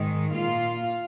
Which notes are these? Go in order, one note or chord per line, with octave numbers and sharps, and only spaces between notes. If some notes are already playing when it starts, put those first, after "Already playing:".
Already playing: G#2 D#3 G#3
A#2 A#3 F4 F5